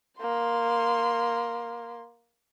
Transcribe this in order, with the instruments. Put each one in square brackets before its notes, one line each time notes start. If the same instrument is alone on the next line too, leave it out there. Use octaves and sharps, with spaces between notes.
[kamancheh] A#3 C6